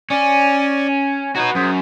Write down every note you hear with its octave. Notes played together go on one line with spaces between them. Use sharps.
C#4 D5 G#5
D#4 F#4 B4 C#5
F#2 G#4 C5